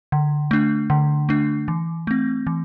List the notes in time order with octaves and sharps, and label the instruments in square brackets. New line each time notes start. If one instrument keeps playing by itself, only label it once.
[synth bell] D3
A3 D4
D3
A3 D4
E3
A3 C4
E3